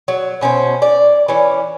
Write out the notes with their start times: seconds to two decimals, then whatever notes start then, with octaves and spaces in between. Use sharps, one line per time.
0.08 F#3
0.41 B2 C#4 E4 C5
0.82 D5
1.28 E3 C#4